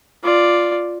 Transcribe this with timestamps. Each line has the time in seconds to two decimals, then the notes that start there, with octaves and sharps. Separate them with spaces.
0.23 F4 D5